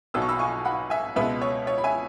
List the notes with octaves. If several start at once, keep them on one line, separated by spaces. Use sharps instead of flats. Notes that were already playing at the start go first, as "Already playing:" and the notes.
B1 B2 F#3 E6
C#6
B5 E6
G#5 C#6
F#5 B5
E5 G#5
C#2 B2 G#3 B3 B4 E5
C#5
C#5
B5
E5 G#5